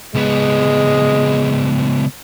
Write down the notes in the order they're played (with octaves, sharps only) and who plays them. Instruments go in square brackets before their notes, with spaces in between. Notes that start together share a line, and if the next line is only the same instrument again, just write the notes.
[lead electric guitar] C#2 B3 [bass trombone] G#3